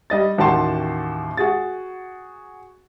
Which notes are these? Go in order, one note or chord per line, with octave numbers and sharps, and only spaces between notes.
G3 D#5 A6
A1 D#2 F#4 G5 A5 C6
F#4 G#4 A6